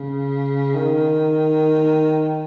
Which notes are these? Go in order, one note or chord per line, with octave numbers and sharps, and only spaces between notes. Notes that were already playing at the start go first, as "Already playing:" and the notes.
Already playing: C#3
D#3